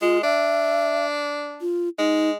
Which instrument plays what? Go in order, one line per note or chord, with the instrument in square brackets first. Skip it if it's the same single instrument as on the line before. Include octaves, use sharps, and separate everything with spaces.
[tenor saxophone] G#3 [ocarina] F4
[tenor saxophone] D4 [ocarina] E5
[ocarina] F4
[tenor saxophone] G#3 [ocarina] D#4